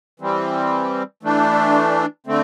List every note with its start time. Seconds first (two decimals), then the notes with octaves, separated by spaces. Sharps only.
0.20 E3 G3 C4
1.23 E3 A3 D4
2.27 D3 A3 C4